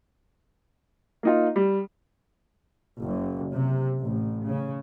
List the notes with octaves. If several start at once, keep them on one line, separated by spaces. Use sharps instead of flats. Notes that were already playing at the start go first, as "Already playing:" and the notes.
A#3 D#4 F4
G3
F#1
C3
A1
C#3